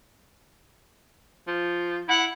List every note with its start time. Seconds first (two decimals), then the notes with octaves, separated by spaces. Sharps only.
1.48 F3
2.08 E4 F#5